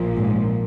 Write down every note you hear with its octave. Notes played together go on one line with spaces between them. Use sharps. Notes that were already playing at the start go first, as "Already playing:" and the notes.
Already playing: A#1 A#2 F3
G#2